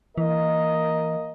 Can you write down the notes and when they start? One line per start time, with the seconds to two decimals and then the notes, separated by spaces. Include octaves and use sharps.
0.18 E3 A#3 A#4 D#5